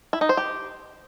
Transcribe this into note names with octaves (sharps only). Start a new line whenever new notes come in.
E4
D#4
C5
G4